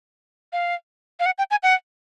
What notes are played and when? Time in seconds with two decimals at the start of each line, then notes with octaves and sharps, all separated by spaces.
0.53 F5
1.20 F5
1.26 F#5
1.38 G5
1.51 G#5
1.63 F#5